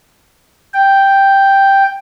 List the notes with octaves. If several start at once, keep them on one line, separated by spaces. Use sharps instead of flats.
G5